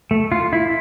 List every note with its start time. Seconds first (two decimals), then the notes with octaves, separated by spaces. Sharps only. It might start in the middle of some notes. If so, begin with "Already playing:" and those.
0.11 A3
0.32 F4
0.53 E4